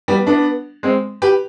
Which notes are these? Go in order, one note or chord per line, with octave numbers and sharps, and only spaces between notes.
G3 B3
B3 D4
G#3 C4
G4 B4